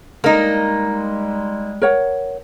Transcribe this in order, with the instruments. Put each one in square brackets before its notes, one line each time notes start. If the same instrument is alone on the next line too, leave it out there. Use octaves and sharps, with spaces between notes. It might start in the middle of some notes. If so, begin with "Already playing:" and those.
[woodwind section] G3 G#3 [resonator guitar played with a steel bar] A#3 D#4 [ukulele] A#4
[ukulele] A#4 C#5 F#5